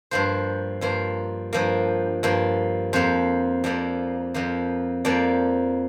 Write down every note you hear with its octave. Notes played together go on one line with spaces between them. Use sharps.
G2 F3 A#3 C5
G2 F3 A#3 C5
G2 F3 A#3 A#4
G2 F3 A#3
F2 F3 A#3 C5
F2 F3 A#3 D5
F2 F3 A#3
F2 F3 A#3 D5